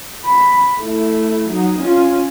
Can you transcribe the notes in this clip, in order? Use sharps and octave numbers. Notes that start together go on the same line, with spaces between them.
B5
A3 E4
F#3 D#4
C#4 F4